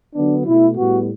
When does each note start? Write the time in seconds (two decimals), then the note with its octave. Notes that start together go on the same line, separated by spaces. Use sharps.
0.15 D3 F#3 B3 D4
0.46 B2 A3 E4
0.77 A2 G3 B3 F#4